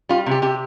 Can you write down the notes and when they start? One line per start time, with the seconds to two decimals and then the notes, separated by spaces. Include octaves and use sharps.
0.09 G3 F4
0.26 C3 G4
0.42 C3 G4